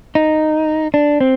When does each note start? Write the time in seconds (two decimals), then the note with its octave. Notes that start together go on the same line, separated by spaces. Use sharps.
0.15 D#4
0.94 D4
1.20 C4